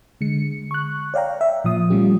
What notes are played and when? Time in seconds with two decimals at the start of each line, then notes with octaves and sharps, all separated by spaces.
0.21 D3 G#3 C#7
0.71 C#6 F#6
1.14 C#5 D5 F5 G5 A#5
1.41 E5
1.64 A#2 F3 D#6
1.90 F3 G3 A3 C#4 F4 G4